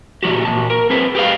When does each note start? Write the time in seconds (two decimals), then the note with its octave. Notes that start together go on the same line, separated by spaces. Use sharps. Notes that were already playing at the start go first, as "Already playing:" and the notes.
0.23 A#2 E3 F3 F#4 G4
0.45 A#2 A5
0.70 A#4
0.90 C4 G#4 B4
1.15 G4 G#4 B4 F5